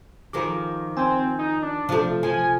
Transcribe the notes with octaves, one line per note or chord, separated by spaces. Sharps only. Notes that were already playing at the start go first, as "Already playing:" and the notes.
D#3 F3 G#3 A#5 D6
C4 G#5 G6
D#4
D4
C3 F3 A3
F3 G#5